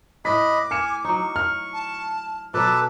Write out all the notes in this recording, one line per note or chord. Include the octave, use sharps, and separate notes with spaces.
A2 B4 D#5 B5 D6 B6
G#5 F6 C#7 E7
F#3 D#4 C#6
F6
A5
B2 F#3 A4 B4 A5 D6